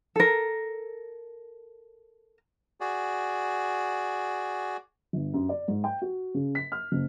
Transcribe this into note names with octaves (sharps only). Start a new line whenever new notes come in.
A4 A#4
F#4 G#4 D5
G1
F#2
D5
G#2
G5
F#4
C#3
B6
F6
F#1